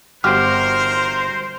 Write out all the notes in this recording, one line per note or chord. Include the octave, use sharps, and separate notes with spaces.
G1 F#4 G4 A#4 C5 F6